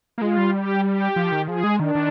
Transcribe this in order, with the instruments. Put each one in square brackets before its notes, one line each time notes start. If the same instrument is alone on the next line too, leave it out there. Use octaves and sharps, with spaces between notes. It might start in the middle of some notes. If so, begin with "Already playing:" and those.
[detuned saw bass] A#3
[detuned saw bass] G#3 [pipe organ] F4
[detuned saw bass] G3
[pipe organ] G4
G4
[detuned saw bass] F3
D#3
[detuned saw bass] F3 [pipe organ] G#4
[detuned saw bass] G#3
[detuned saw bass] D#3 [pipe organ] D4
[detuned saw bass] D#3